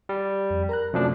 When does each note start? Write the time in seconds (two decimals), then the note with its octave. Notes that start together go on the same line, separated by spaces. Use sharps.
0.09 G3
0.50 F2
0.69 A#4 A#5 F#6
0.93 F#2 C3 F3 A3 D4